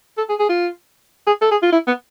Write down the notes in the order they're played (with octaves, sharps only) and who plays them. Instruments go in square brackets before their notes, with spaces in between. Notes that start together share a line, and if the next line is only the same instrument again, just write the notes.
[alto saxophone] A4
G#4
G#4
F4
G#4
A4
G#4
F4
E4
B3